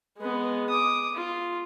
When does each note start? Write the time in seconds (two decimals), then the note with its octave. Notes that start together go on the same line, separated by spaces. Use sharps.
0.17 G#3 B3
0.69 D6 D#6
1.15 F4